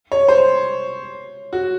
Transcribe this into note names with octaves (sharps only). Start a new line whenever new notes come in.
C#5
C5
F#4